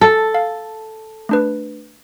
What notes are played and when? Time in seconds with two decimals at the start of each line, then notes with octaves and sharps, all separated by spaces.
0.01 A4
0.34 F5
1.29 A3 D4 B4